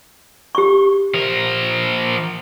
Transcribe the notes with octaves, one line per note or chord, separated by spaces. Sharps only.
G4 C#6
F3 A#4